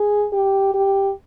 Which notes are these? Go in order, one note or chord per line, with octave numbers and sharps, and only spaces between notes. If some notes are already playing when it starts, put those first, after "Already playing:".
Already playing: G#4
G4
G4